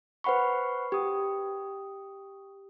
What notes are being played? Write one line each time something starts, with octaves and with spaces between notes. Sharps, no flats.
B4 C5 F#5 B5 C#6
G4 D#6